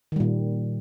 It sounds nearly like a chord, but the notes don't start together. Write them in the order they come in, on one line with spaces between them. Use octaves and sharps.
D#3 G3 A#2